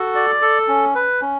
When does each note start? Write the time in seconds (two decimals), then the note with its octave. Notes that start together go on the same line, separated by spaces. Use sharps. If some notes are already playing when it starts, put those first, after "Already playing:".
Already playing: F#4 A4
0.15 D5
0.42 A4
0.68 C#4
0.95 B4
1.21 C#4